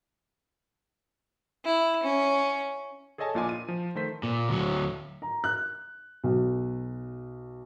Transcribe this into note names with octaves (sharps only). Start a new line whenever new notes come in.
E4
C#4
G#4 A4 C#5 D#5 G#5 A5
A#1 A#2 F4 D#5 G#5 D6
D#7
F3
D#3 A3 C5 B6
A#2
D2 F#3
A#5
F#6
B1